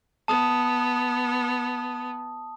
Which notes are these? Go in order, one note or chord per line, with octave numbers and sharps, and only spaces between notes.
B3 A5 D#6